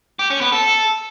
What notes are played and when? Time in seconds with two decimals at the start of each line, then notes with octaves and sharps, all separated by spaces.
0.19 G4
0.30 C#4
0.41 B3
0.52 A4